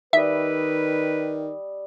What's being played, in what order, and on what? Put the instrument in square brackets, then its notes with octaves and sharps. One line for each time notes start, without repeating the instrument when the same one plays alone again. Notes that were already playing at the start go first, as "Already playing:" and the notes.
[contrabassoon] D#3 [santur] G3 D#5 E6 [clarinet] B4 [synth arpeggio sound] E5